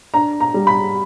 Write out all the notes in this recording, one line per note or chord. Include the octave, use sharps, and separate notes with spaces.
D4 A#5
A#5
G3
B5